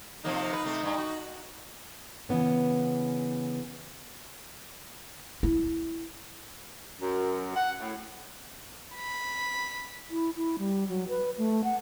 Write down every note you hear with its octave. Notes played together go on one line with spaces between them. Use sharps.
C3 F3 A#3 D#4
B4
C3 A3
G2
F#4
C#3 E3 B3 C#4
E4
F#2
F#5
A2
B5
E4
E4
G3
F#3
B4
A3
F#5